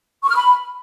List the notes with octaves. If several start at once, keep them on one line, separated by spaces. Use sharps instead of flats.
C#6
F6
B5